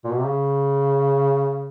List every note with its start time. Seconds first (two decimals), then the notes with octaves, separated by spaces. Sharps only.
0.04 A#2
0.11 B2
0.18 C3
0.25 C#3